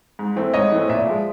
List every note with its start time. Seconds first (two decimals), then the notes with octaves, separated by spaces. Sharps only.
0.19 G#2
0.36 E3 A3 C4
0.53 G#2 C#5 D#5
0.72 E3 A3 C4
0.89 A#2 D5 E5
1.07 F3 G#3